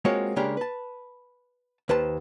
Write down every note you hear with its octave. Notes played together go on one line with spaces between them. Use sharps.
G#3 A#3 C4 F4 F#4 C#5
C#3 G#3 A#3 D4 G4
B4 A5
D#2 B4 C5 A5